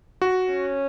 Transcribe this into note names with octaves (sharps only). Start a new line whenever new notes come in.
F#4
C#4